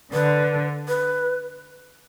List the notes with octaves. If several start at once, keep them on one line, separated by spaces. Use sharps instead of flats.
D3 B4
B4